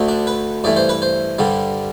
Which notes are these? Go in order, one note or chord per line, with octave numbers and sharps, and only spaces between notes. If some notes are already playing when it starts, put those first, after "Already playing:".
Already playing: D2 D3 A3
D4
B4
G2 E3 A3 D5
C5
B4
C5
G2 D3 G3